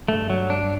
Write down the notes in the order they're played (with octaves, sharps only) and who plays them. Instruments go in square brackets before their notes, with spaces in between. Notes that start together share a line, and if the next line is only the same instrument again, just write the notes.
[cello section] G2 [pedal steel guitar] A3
[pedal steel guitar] F#3
D4